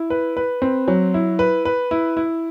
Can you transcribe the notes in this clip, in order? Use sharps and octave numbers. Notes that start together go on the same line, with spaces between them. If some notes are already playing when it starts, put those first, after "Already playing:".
Already playing: E4
B4
B4
C4
F#3
E4
B4
B4
E4
E4